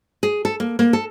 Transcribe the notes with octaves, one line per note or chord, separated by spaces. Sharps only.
G#4
A4
A#3
A#3
A4